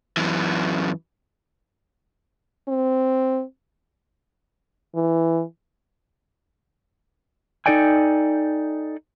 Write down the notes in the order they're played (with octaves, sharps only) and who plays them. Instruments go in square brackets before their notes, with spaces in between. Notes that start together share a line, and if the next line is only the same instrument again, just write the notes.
[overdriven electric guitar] F#2 E3
[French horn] C4
E3
[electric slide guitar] D#4 F#4 A4 D5 G5 G#5